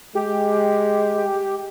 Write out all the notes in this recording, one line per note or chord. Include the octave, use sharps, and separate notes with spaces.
G#3 G4